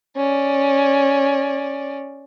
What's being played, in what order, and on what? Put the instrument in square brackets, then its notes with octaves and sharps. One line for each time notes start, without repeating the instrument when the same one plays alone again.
[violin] C#4 D5